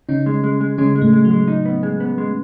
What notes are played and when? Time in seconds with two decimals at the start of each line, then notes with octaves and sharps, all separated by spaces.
0.09 C#3 C#4 D#4
0.26 G#3
0.44 G#3
0.61 G#3
0.78 C#3 G#3 C#4
0.95 G#3
1.02 A2 A3
1.13 G#3
1.25 F#3
1.31 G#3
1.48 D#4
1.65 B3
1.83 G#3
2.00 B3
2.18 G#3